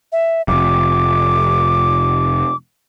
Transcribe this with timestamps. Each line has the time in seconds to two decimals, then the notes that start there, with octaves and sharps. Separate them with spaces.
0.12 E5
0.48 F1 D6